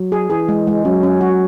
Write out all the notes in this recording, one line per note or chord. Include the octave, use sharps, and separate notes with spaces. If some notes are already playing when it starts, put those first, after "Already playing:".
Already playing: F#3
G#4
E3 G#4
G#3
G#3
F#3 C#4
C#4
F#4